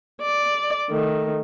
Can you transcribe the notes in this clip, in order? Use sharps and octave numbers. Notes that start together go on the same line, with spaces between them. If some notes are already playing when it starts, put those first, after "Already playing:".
D5
D#3 A3